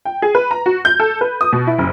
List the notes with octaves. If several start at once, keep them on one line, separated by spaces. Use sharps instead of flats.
G5
G#4
B4
A#5
F#4
G6
A4
B4
D#6
B2
E4
F#1